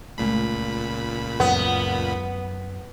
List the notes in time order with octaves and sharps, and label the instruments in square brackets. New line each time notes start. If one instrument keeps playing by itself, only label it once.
[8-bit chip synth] C#2 A#2 B5 [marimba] G#3 A3
[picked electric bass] F#2 [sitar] B3